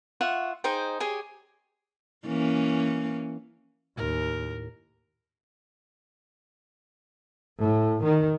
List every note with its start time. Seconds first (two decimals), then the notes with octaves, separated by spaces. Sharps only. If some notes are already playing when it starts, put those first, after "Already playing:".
0.21 F4 E5 F#5 C#6
0.64 D#4 G#4 C5 G5
1.00 G4 G#4 C#5 G#5
2.26 E3 A#3 C#4
3.97 D#2 A2 A#4
7.60 A2
8.03 D#3